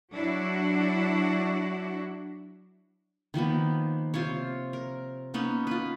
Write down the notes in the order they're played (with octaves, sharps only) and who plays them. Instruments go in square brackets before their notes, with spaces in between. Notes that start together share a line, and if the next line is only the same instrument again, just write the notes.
[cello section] F#3 D4 E4 F#4
[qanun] D#3 F3 A#3 B3
C3 F4 C5 C#5
A#4
A#3 B3 C#4 D#4
F4 B4